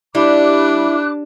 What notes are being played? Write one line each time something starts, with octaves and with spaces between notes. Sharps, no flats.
G3 D4 E4 B5 D6 F#6